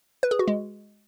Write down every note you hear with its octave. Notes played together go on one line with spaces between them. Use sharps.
B4
G#4
F#4
G#3